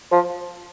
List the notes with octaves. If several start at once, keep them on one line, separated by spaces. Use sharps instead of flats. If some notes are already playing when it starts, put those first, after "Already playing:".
F3